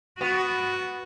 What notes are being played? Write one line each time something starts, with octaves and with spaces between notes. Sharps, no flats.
B3 F#4